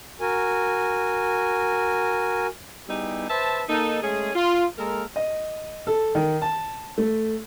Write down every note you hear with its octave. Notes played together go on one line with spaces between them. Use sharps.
F#4 A#4 G#5
G3 B3 D#4 E4 G4 G#4
B4 C5 E5 A5
A#3 D#4 A4
G#3 A3 C#4 G#4
F4
G#3 A#3 A4 A#4
D#5
A4
D#3
A5
A3